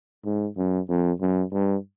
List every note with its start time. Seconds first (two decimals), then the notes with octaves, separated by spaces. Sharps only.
0.25 G#2
0.57 F#2
0.89 F2
1.21 F#2
1.53 G2